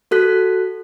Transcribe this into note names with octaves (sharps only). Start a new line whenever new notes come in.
F#4 A4 F#6 B6